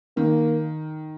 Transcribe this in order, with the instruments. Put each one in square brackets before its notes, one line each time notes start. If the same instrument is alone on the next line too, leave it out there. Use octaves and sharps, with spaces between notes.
[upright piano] D#3 [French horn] A#3